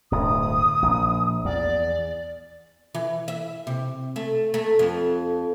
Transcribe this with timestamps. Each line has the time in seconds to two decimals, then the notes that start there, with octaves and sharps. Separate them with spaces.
0.12 D1 D2 G2 D#6
0.82 A#1
1.45 E2 D5
2.94 E3
3.28 E5
3.67 C3
4.16 A3
4.54 A3
4.79 F2